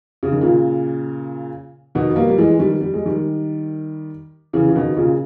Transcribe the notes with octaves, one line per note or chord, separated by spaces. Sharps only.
C#3
D#3
A#2 C#3
B2 D#3
B3
G3 A#3
G3
E3 G#3
D#3 G3
G3
G#3
D#3 G3
C#3 E3
C#3
B2 D#3
A#2 C#3